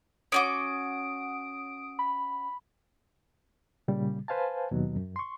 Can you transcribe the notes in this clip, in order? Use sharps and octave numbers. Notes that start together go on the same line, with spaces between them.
C#4 F#4 D6 D#6 D7
B5
A#2 C#3 G3
B4 C5 F5 G#5 A5
D#2 B2 F#3
F#2
C6 C#6